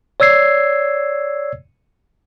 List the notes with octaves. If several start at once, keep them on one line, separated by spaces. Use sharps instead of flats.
C#5 D5 E6 G#6 C7